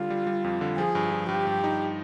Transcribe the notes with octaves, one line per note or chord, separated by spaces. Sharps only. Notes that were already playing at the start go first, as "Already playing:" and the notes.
Already playing: D3 G3 F4
G3
G3
F2
D3
F3 G#4
G2
F3
G2 G4
G2
D#4